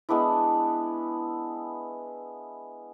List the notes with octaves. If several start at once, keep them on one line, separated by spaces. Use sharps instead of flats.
G#3 B3 D4 E4